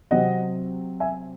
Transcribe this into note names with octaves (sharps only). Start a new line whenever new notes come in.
C3 F#3 C4 D#5 F#5
E5 G#5